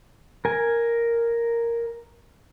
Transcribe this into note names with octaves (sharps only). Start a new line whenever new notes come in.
A#4 G#5